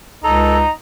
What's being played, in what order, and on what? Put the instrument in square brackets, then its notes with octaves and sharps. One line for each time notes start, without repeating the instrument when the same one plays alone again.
[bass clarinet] C#2 [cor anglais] D#4 [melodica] A4 [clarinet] A#5